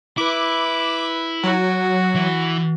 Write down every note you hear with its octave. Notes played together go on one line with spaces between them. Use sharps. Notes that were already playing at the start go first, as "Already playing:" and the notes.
E4 B4 D6
F#3 F#4
E3